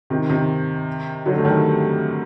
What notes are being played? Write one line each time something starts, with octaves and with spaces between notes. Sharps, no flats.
C3 D#3
C3 D#3
D3 F#3
A3
D#3 G3